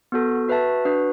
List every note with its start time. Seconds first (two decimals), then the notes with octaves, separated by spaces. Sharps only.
0.12 B3 F#4 A4
0.48 F#4 B4 E5 A5
0.85 D4 F#4 B4